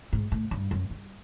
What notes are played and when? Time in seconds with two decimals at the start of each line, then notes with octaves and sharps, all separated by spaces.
0.13 G#2
0.32 A2
0.51 G2
0.71 F#2
0.90 G2